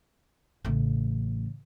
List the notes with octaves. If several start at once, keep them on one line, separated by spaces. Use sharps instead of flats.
A1 C#3